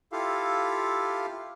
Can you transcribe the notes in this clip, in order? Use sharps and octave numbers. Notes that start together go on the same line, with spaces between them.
E4 F4 G4 A4 F5